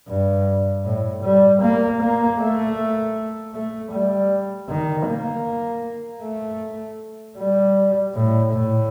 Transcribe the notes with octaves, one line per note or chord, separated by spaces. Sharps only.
G2
A2
G3
A#3
A#3
A3
A3
G3
D#3
A#3
A3
G3
A2
A2